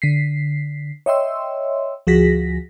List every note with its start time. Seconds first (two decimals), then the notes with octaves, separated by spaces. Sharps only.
0.02 D3 B6 C7
1.06 C#5 D#5 E5 G5 C6 E6
2.07 D2 F3 F#4 G#4 A#6 B6